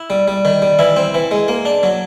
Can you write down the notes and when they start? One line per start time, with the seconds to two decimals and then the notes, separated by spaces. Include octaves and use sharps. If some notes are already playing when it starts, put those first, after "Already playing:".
Already playing: E4
0.10 G3
0.28 G3
0.45 D#3
0.62 G3
0.79 E3 E4
0.96 C4
1.14 E3
1.31 G#3
1.48 A#3
1.65 D4
1.83 F#3